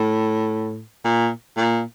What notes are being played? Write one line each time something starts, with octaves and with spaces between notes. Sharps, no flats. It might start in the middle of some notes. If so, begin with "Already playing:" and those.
Already playing: A2
A#2
A#2